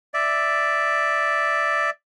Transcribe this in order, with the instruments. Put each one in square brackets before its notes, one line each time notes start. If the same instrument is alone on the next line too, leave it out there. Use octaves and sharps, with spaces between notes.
[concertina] D5 E5